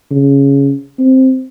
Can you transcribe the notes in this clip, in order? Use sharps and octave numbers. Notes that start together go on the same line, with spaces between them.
C#3
C4